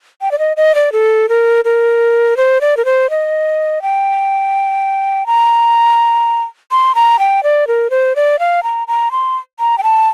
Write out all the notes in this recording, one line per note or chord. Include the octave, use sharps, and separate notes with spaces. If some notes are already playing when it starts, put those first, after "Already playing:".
G5
D5
D#5
D#5
D5
A4
A#4
A#4
C5
D5
A#4
C5
D#5
G5
A#5
C6
A#5
G5
D5
A#4
C5
D5
F5
A#5
A#5
C6
A#5
G5
A5